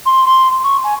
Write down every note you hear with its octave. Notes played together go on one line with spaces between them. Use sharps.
C6
C6
C#6
G#5